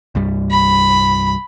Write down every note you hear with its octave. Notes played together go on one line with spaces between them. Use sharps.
C2 G2 G3
B5